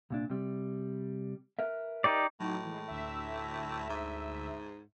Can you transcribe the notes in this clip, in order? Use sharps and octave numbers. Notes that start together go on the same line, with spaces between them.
C2 A#2 D4
C3 G3
A#4 B4 E5
D#4 G4 D5
A2 F#3 D#4 F#4
E3 G#3
D2 E5
G#2